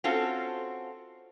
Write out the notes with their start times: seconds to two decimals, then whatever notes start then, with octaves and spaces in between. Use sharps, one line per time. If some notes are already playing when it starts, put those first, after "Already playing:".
0.04 C4 C#4 F4 F#4 A4